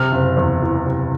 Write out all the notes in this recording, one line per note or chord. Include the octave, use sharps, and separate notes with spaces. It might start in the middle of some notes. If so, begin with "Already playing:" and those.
Already playing: C3 F6
F#1
E2
E3
C3